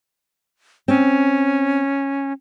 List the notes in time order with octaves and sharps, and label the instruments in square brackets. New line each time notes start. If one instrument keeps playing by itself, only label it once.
[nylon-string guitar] C4 [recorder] C#4